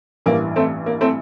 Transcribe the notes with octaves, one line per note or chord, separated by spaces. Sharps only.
A1 G2 E3 A#3
A3 C4
A#3
A3 C4